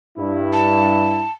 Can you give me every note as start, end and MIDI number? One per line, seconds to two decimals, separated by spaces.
0.18 1.24 43
0.18 1.24 64
0.53 1.31 81